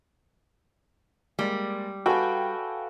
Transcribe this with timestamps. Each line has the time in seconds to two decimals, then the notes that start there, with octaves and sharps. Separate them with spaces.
1.39 G3 G#3 A#3 D5
2.06 F#4 A4 B4 F5 G5 G#5